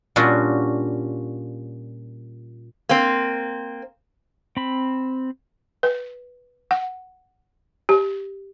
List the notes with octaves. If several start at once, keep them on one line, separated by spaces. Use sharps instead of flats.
A#2 G3 C#4 D4 F4 F#4
A#3 C4
C4 B5
B4
F#5
G4